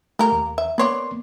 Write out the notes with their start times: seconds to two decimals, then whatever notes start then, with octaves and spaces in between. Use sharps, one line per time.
0.19 A3 A#3 G4 A#4
0.32 D#2
0.58 E5
0.78 A#3 B3 B4 C#5 D5 C6